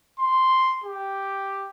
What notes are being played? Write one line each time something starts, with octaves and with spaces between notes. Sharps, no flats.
C6
G4